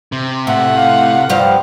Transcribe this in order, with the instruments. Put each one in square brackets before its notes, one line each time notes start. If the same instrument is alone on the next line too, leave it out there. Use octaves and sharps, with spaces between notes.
[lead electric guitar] C3
[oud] A2 [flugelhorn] E5 [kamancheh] F#5
[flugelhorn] F5
[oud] G2 F3 G3 [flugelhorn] F5